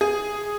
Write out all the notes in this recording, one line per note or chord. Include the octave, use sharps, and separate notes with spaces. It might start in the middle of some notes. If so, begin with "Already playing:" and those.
G#4